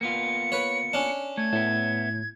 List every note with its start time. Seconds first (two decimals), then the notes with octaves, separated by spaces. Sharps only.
0.01 A#3 B3 F4 C#7
0.52 B4 C#5
0.93 C#4 D4
1.37 A3 G#6
1.53 A2 B3 E5